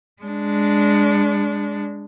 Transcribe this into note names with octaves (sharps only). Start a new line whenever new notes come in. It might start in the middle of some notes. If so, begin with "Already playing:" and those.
G#3 D4